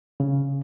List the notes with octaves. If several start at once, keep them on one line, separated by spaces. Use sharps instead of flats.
C#3